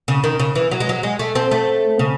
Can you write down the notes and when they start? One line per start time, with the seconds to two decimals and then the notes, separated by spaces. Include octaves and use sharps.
0.08 C#3
0.24 D#3
0.40 C#3
0.55 E3
0.71 F#3
0.80 G#3
0.89 F#3
1.03 G#3
1.19 A3
1.35 C4
1.51 A3
1.99 C#3